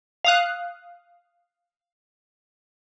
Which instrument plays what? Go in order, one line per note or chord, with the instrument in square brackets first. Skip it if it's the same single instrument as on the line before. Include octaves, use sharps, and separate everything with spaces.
[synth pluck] F5 D#6 F#6